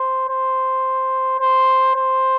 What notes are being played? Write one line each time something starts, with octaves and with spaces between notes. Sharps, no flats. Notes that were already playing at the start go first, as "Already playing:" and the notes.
Already playing: C5
C5
C5
C5